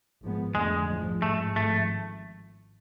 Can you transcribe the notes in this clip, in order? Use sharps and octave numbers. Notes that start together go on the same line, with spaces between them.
G#1 G#2 F3 G#3 B3
F2 D3 G#3 A3
A1 G#2 F3 G#3
A1 G#2 G#3 A3
G#1 G#2 F3 A3